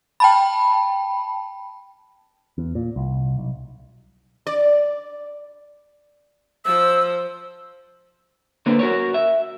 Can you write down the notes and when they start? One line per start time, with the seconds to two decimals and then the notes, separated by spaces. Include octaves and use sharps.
0.20 G5 A5 B5
2.58 E2
2.75 A#2
2.96 C2
3.38 B1
4.47 D5
6.65 F3 C5 E6
8.66 D3 A#3 B4 C5
8.79 F#4 A#4 C#5
9.14 E5